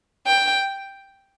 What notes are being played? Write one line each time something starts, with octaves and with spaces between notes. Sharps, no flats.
G5